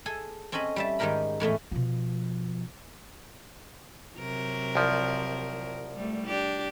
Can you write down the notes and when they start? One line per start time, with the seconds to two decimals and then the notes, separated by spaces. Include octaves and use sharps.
0.06 G#4 A4 G#5
0.52 C4 C#4 A4 D#5 G#5 B5
0.76 G3 E5 A5
0.99 G#2 D#3 D#4 G4 A#4 B5
1.40 E2 A2 A3 C#4
1.72 B2 F3
4.18 C3 F#3 A#4
4.75 C2 F3
5.96 G3 A3
6.26 D4 G4